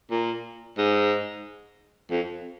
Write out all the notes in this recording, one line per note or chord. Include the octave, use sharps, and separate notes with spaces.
A#2
G#2
F2